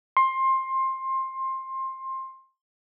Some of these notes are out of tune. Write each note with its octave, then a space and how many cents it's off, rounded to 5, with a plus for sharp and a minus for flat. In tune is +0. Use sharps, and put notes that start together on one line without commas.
C6 +20